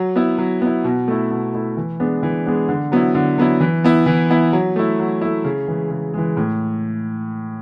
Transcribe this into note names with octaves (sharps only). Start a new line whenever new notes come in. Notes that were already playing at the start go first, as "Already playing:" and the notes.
Already playing: F#3
B3 E4
F#3
B3 E4
B2
A3 E4
B2
A3 E4
E3
G#3 B3 D4
E3
G#3 B3 D4
D3
F#3 B3 E4
D3
F#3 B3 E4
E3
B3 E4
E3
B3 E4
F#3
A3 E4
F#3
A3 E4
C#3
E3 G#3
C#3
E3 G#3
A2